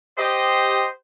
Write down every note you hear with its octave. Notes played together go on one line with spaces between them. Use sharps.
G4 C5 D#5